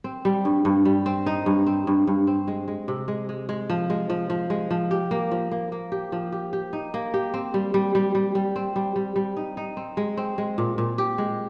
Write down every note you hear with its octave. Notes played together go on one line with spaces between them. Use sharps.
C4
G3
G2
G2
G3
C4
D#4
G2
C4
G2
G2
C4
G#3
G#3
C3
G#3
G#3
G#3
F3
G#3
F3
F3
G#3
F3
G4
A#3
F3
A#3
A#3
G4
F3
G4
G4
D#4
A#3
G4
C4
G3
G3
G3
G3
G3
C4
G3
G3
G3
D#4
D#4
C4
G#3
C4
G#3
A#2
A#2
G4
G#3